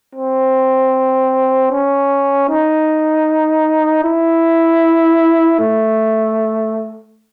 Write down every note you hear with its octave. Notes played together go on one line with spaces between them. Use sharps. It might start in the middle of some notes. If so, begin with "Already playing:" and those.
C4
C#4
D#4
E4
A3